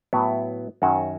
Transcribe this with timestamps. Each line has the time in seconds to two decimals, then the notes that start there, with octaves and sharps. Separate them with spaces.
0.13 A2 F#3 B3 E4
0.82 F#2 D#3 F#3 C#4 F#4